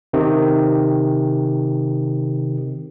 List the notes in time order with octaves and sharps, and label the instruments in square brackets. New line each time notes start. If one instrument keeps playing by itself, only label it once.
[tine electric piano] C3 D#3